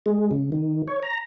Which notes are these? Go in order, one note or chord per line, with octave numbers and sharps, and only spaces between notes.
G#3
C#3
D#3
C#5
A#5